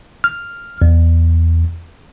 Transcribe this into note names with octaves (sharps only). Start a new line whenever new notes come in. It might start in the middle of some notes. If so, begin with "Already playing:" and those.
F6
E2